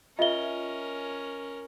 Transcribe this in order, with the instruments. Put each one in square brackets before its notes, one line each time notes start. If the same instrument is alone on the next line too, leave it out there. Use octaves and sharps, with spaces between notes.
[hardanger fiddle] C#4 A#4 [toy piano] F4 E5 [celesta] D#5 G7